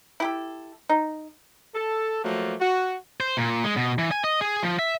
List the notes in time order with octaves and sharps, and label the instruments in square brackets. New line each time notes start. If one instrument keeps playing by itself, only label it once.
[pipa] E4 G4 A4
D#4
[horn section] A4
F3 F#3 A3 A#3
F#4
[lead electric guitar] C5
A#2
G#3
B2
E3
G#5
D#5
G#4
F3
E5